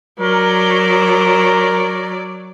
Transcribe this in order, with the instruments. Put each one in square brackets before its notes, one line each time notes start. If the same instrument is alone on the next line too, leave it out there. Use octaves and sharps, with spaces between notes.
[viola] F#3 D5 [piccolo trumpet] A#4